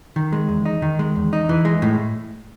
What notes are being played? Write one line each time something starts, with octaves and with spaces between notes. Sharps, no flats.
D#3
G#3
E2
D#4
D#3
G#3
E2
D#4
E3
G#3
A2